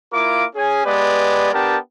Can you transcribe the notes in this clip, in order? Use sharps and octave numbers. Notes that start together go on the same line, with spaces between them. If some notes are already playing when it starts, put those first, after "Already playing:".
A#3 E4 F4 A#4 D6
C#4 G#4 G#5
G#3 B3 G4 B4 D5
B3 D4 G4 A#4 G5 A5